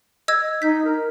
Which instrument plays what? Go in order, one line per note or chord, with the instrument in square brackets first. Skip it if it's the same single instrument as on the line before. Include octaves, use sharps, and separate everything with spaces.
[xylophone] D#5 E6 G#6
[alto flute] D#4 [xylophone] G6 B6
[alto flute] A#4